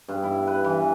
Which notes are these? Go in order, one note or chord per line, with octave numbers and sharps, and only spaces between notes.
G2
E4
B4
E3